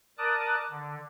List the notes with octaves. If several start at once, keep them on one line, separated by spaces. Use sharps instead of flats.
A#4 D5 A5 D6 D#6 F#6
D3